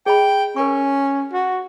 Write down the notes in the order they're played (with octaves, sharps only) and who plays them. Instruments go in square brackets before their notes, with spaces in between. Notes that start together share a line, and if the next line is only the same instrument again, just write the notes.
[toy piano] G#4 D#5 B5 [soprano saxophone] G5
[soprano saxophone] C#4 [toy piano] A#4 C#6
[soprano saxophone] F#4